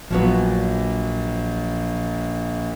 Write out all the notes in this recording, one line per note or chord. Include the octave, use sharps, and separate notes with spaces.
A#1 F3 F#3 B3